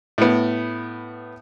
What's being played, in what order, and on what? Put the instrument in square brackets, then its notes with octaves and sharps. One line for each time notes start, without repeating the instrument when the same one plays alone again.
[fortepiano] A2 B3